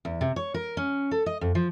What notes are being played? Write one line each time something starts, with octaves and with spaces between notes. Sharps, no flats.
E2
C3
C#5
A#4
C#4
A4
D#5
F2
F3